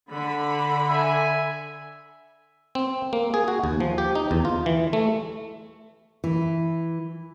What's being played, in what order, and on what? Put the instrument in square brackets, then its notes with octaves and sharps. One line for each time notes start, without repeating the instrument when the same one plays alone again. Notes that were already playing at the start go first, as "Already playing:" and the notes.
[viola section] D3 B5
[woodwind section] E5 G#5
[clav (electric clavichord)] C4
A#3
G#4
F#4
D#2
F3
G4
D#4
E2
F4
E3
A3
[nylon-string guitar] E3